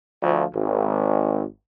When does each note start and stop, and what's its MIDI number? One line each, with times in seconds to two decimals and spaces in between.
0.23 0.45 38
0.23 0.45 53
0.54 1.43 32